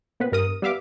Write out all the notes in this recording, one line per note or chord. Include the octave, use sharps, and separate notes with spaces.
A#2 B3 C4 B4
G2 A#4 D#6
G3 B3 E5 F5 D6